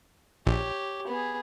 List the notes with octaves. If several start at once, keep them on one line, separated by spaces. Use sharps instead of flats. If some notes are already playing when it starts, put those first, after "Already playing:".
A#1 G4 C#5
B3 G#4